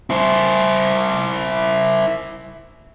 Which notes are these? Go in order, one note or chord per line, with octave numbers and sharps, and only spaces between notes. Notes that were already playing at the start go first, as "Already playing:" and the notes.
E4 C5